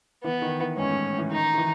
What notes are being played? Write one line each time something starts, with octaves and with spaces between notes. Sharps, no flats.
E3 B3
D#3
E3
G#2 C#4
A2
E3
D#3 D#4
D#3
E3